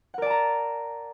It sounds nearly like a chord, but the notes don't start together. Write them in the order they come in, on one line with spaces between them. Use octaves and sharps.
F#5 A#4 D5 A5 A#5